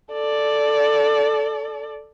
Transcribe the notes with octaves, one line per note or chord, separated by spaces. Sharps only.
A4 D5